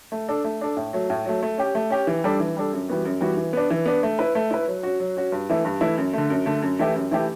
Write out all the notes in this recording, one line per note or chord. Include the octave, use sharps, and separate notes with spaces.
A3
D4 A4
A3
D4 A4
A2
F#3 A3
A2
F#3 A3
A3
C#4 G4
A3
C#4 G4
E3
G3 D4 A4
E3
G3 D4 A4
F#2
E3 G3 B3 F#4
F#2
E3 G3 B3 F#4
E3
B3 D4
E3
B3 D4
A3
E4 B4
A3
E4 B4
F#3
C#4 F#4
F#3
C#4 F#4
G2
E3 A3 E4
G2
E3 A3 E4
F#2
D3 A3
F#2
D3 A3
F#2
E3 A3 E4 G4
F#2
E3 A3 E4 G4